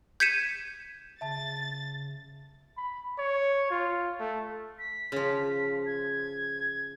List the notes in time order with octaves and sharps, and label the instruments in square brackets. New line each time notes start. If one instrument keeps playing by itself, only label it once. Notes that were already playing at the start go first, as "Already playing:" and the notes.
[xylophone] G6 G#6 B6 C#7 D#7 E7
[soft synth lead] C#3 [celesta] E5 A5 [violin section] A6
[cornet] B5
C#5
F4
A3
[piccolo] B6
[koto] C#3 F3
[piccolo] G#6